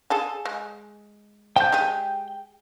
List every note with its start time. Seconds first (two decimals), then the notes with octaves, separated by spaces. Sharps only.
0.10 G#4 A4 G#5
0.45 G#3
1.56 F3 A3 G5 G6
1.72 G#3 G4 G#4